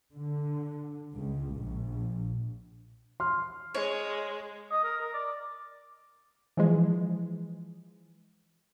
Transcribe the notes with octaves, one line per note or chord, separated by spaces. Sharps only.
D3
C#2
A#1
C6 F6
G#3 C#5
D#5
A#4
A#4
D5
E3 F3 G#3